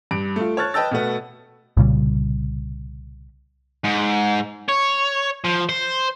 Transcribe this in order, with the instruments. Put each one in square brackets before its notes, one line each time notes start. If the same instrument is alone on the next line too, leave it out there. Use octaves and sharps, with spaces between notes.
[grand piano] G2 D7
A3 F4
C#5 A5 F6 F#6 A6
B4 D#5 G5 A5 E6 A6
B2 A3 B3
[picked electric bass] C2 A#2 C#3 G3
[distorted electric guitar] G#2
C#5
F3
C5